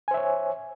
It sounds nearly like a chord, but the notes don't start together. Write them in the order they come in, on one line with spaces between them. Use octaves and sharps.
G#5 C5 E5 C#5